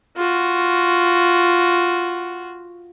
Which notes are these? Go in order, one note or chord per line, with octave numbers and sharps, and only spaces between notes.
F4 F#4